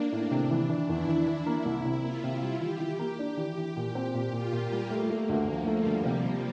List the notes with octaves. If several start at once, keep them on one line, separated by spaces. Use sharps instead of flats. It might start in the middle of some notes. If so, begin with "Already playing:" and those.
Already playing: A#3 D4
A2
C3
E3
E3
E2 E4
E3
D4
E3
A#3 E4
C2
C3
A#3 F4
C3
G3
E3 G4
E3
A#3
D4
E3
E3
A#2
C4
A#2
A#2 F4
A#2
A#3
G3
A3
A3
D2
D2 F3
A3
G3
D2
C3
C3